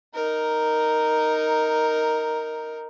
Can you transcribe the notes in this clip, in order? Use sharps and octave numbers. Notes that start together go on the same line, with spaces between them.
D#4 A#4